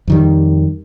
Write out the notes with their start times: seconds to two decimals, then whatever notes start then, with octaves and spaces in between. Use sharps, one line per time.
0.08 F2 D#3 G3